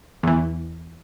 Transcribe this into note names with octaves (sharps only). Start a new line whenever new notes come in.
E2 E3